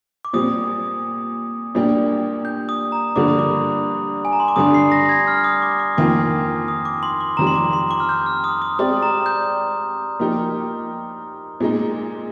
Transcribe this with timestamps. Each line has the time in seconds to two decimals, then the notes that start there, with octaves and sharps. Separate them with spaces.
0.25 D6
0.33 A#2 G3 C4 D#6
1.75 A#2 G3 A#3 D4 G4
2.45 G6
2.69 D#6
2.92 A#5
3.16 G2 D3 F3 A#3 D4 D6
3.28 D#6
3.39 D6
4.25 G#5
4.33 A#5
4.40 C6
4.48 D6
4.56 G2 D3 G3 D4 D#6
4.74 C7
4.92 A#6
5.09 G#6
5.27 F6
5.44 D#6
5.62 D6
5.80 D6
5.97 F2 D#3 A#3 F4 D6
6.68 D#6
6.85 D6
7.03 C6
7.21 D6
7.37 F2 D#3 G3 A#5
7.47 C6
7.55 D6
7.73 C6
7.91 D6
8.00 F6
8.09 G6
8.26 F6
8.44 D#6
8.62 D#6
8.79 G#3 C4 G4 D5 D#6
9.03 A#5
9.26 G6
10.20 F3 A#3 D#4 G4
11.60 A#2 G#3 D#4